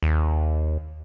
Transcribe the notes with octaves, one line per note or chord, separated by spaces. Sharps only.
D#2